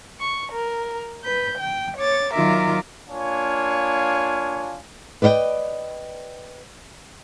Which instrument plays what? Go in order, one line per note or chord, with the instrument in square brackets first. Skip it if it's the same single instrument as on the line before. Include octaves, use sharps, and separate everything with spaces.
[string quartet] C#6
A#4
B4 G6
G5
C#5 D6 A6
D#3 F#3 F4 A#4 E5 D6
[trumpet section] A#3 D4 F4 C#5 F5 G#5
[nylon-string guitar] B4 D5 D#5 F5 G5